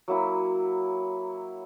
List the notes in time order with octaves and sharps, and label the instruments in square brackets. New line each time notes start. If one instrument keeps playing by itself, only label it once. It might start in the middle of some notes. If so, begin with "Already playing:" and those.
[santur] F#3 A#3 E4